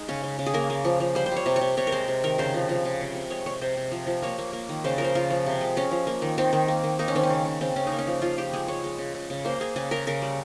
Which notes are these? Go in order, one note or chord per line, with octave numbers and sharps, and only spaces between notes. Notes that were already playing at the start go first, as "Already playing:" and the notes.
Already playing: G#3 D#4
C#3 C#4
C#3
C#3
G#4
A#3 A#4
A#3
F3
F3
G3 C5
C5
G3 C#5
C3
C#5
C3
C3 C#5
A#4
G#3 C5
C3
D#3 A#4
C#3 C5
F3
F3
C#3
C3
C3
G#3 C#5
C3 C#5
C3 C5
C3
F3
F3
A#3 C#5
A#3
A#3
D#3
C#3 C5
F3 A#4
C5
C#3 F4
F3
C3
G#3
G#3 C#4
F3
A#3
D#3
D#3 C4
D#3
A#3
D#3
A#3 D#4
C#4
D#3 C4
C#4
C#3
C#3
C#3 C4
C#3 C#4
D#4
A#3
C#4
F3
F3 F4
F3 G4
G#3 G#4
G#3 C#5
G#3
C#3
C#3
C#3
A#3 C5
A#3 G#4
C#3 G#4
C#3 A#4
C#3 A#4
G3